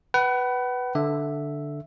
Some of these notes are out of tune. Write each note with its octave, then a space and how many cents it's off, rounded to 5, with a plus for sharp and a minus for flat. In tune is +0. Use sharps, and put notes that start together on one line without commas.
B4 +0 F#5 +35
D3 +0 E5 +0